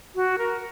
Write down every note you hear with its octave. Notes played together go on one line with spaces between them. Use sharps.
F#4
A#4